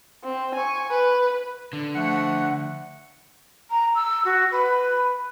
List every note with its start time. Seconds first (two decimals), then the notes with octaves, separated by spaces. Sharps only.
0.25 C4
0.55 G#5 C#6
0.91 B4
1.73 D3
1.95 F3 A3 F#5
3.70 A#5
3.95 E6
4.24 F#4
4.51 B4